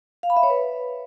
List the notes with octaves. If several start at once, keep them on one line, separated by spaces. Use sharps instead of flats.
F5
B5
E5
C#5
B4